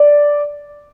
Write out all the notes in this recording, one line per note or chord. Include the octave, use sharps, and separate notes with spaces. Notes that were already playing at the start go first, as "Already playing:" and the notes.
Already playing: D5